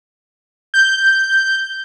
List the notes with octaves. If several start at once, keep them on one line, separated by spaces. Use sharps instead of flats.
G6